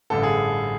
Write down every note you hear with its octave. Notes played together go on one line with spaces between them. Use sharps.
A1 G2 D3 A4
G#4